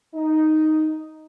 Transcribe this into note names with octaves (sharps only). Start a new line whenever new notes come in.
D#4